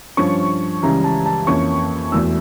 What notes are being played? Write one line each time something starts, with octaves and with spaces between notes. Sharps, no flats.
G2 F3 C#4 C#6
C#2 C#3 E3 G3 A#5
A5
A5
F2 E3 A#3 C#4 C#6
E1 E2 E3 A3 E6